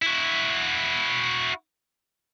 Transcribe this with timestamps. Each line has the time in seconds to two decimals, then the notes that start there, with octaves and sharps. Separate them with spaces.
0.02 E4 F#4